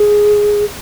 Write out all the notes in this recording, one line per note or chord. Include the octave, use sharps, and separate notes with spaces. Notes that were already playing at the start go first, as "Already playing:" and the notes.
Already playing: G#4